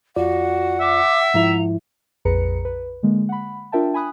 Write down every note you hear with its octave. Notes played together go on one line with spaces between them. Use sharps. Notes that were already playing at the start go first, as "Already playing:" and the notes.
F2 F4 F#4 D5 F#5
E5 D6
G#2 F3 E4 A#5
A#1 F2 G#4 B4 A#5 C#7
B4
D3 G#3 A#3
F#5 B5
D4 F4 A#4 E5 G5 A5
G#5 B5 D#6 F#6